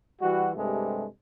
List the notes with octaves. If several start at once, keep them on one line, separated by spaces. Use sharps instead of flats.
E3 G3 F#4
G2 C3 G#3 A3